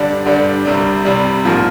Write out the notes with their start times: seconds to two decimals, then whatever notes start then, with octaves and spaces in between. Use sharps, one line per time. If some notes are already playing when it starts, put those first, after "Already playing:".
Already playing: G2 D3 G3 D4
0.26 G2 D3 G3 D4
0.65 C2 C3 G3
1.05 C2 C3 G3
1.45 A#1 G#2 F3 A#3